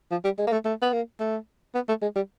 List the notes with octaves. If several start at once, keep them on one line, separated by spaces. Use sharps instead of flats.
F3
G3
G#3
A#3
A3
A3
B3
A#3
A3
B3
A3
G#3
G3